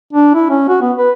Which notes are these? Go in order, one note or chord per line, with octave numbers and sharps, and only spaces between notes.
D4
E4
C#4
F#4
B3
B4